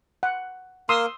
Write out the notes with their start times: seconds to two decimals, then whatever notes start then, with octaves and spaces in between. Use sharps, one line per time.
0.23 F#5
0.89 A#3 A#4 C6 D#6 E6